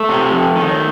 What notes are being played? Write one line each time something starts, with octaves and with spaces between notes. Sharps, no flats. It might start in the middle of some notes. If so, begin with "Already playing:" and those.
Already playing: A3
C3
F2
D#3